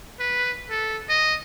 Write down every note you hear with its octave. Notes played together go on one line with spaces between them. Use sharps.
B4
A4
D#5